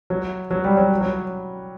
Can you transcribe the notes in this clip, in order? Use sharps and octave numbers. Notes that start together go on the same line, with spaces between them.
F#3
F#3
G3
F#3
F#3